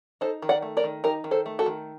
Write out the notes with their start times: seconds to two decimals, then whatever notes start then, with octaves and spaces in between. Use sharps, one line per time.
0.21 D#4 A4 C5
0.42 D#3
0.49 D5 F#5
0.62 A3
0.77 A#4 D5
0.84 D#3
1.04 D#4 G4 A#4
1.24 D#3
1.31 A4 C5
1.46 A3
1.59 F#4 A4
1.66 D#3